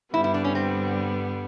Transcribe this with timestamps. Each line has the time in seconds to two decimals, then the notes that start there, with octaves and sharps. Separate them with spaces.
0.14 G2 D3 G3 B3 E4
0.24 E4
0.34 D4
0.44 C#4
0.55 C4